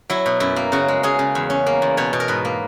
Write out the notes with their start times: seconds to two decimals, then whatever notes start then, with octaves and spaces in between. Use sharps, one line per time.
0.10 F#3 E4
0.26 B2
0.40 F#2 E4
0.56 A#3
0.72 C#3 F#4
0.88 G#3
1.03 C#4 G#4
1.19 C#3
1.35 E2
1.50 C#4
1.67 A#3
1.82 E2
1.97 B2 C#5
2.13 B2
2.20 A#4
2.28 G#2 B4
2.45 A#3